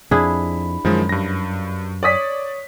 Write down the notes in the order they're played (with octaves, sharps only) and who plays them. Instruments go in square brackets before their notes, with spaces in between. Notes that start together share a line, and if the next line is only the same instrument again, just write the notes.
[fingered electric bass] F2 [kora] D4 E4 G#4 [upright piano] B5
[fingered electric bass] F#2 [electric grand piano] D#3 F3 G#3
[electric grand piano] G2 A#6
[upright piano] C#5 D#6 B6 [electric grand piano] D5